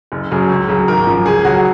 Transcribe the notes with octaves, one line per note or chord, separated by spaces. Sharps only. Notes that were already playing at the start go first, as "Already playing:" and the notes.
F#1
F#2 C#3 F#3
C#2
C#3 F#3
G#1 A#4
F#2 F3
C#2 G#4
C#3 F#3 F#4
F#4